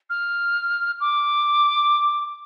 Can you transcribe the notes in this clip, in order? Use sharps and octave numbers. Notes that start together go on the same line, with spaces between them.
F6
D6